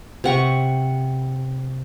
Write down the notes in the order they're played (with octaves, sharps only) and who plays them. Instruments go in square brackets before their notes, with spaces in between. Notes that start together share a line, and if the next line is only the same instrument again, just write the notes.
[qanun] C3 F#5 C#6